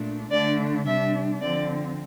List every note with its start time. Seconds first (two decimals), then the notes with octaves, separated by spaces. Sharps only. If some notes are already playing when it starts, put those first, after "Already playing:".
Already playing: A#2 A3 D4
0.30 D3 A3 D4 D5
0.86 C3 G3 D4 E5
1.41 D3 F3 C4 D5